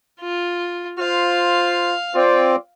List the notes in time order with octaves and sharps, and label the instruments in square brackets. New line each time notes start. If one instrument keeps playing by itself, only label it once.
[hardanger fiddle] F4
[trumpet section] F4 C5 [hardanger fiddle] F5
[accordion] C4 [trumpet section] F4 D5